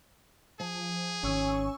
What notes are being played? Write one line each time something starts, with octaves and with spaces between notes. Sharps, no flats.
F3 G#4
G#1 D#3 C#4 G#5 C#6 E6